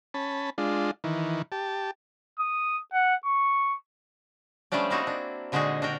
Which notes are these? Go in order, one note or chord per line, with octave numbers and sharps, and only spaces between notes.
C#4 A5 B5
G#3 D4 F4
D#3 E3
G4 A5
D#6
F#5
C#6
F3 G3 A3 C#4 D4 D5
A#3 C4 D#4 E4 F#4
D4
A#2 D3 G#3 D#4 F#4 G#4
D4 F#4 A#4 G5